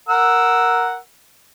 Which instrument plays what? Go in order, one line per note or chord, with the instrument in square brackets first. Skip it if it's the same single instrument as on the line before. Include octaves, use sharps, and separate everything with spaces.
[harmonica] A#4 F#5 E6